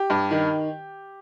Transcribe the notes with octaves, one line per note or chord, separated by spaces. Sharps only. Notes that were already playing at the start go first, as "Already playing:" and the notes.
Already playing: G4
G2
D#3